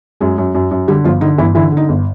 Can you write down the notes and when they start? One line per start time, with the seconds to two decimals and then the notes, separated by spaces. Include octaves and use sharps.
0.21 F#2 G#3 G#4
0.38 F#2
0.55 F#2
0.71 F#2
0.88 D3 G3 G4
1.04 G1 F3 F4
1.21 D3 D#4
1.38 G1 E3 E4
1.55 D3 E3 E4
1.72 D3
1.77 D#4
1.89 G1